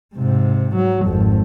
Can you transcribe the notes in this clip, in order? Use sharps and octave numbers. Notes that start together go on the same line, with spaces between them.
G#2 C3
F#3
G#1 F2